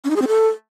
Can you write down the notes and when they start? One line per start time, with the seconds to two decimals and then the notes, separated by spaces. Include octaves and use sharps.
0.04 C#4
0.10 D#4
0.16 G#4
0.22 C4
0.28 A4